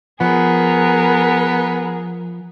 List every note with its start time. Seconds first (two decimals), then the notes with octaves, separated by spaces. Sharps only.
0.21 F3 B3 G#4 A#4